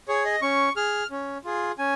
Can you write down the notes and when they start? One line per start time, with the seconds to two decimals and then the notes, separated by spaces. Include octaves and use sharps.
0.08 G#4 C#5
0.25 D#5
0.42 C#4 C#6
0.76 G#4 F6
1.11 C#4
1.44 F4 G#4
1.78 C#4 G#5